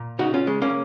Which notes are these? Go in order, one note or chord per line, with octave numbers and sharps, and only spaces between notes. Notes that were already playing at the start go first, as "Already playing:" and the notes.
Already playing: A#2
C#3 D#4 F#4
C#4 F4
C#3 G#3
A#3 C#4